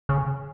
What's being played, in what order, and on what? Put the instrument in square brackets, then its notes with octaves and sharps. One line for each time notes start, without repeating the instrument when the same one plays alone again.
[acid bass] C#3